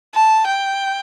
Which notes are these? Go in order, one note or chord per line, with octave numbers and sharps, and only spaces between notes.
A5
G5